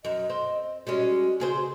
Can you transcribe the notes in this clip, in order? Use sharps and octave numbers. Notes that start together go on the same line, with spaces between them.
F#2 D#5
C4
G3 G#3 C#4 F#4
C#3 G#4 C5